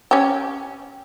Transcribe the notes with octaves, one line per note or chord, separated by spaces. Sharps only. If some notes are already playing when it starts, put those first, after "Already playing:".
C#4 G4